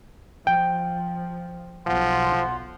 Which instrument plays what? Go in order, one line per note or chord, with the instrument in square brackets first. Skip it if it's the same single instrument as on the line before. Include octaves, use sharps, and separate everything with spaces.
[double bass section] F3 [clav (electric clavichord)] G5
[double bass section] B1 [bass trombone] F3 [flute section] F#5 C6